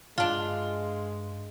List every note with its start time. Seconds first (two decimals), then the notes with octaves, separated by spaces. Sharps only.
0.18 G2 G#3 D4 F4